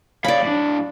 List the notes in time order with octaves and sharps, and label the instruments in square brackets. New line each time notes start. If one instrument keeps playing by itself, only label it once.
[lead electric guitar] C#5 F5 [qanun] D5 B5
[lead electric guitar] A2 D4